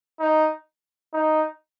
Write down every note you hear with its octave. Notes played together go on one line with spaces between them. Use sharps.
D#4
D#4